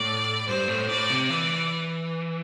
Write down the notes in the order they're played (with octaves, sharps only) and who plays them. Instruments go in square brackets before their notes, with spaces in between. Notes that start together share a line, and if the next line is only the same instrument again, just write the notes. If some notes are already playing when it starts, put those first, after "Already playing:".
Already playing: [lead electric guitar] A2 [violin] D5
[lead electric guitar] G2 [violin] C5
[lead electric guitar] A2
[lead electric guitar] A2 [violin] D5
[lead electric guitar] C3
[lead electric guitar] E3 [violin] D5